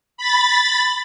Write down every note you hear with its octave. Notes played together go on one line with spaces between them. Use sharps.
B5 A6